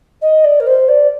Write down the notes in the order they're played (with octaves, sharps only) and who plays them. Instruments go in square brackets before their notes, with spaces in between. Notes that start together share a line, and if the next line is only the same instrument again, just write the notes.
[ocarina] D#5
D5
A#4
C5
D5